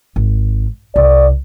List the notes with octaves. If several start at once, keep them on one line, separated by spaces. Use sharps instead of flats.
G#1
C2 D5